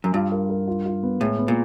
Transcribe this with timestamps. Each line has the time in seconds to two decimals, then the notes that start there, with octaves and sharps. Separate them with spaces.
0.04 F#2
0.14 G2 F4
0.32 A#4
0.50 A#4
0.68 F4
0.86 F4
1.03 B3
1.21 A2 G#3
1.38 B3
1.48 A#2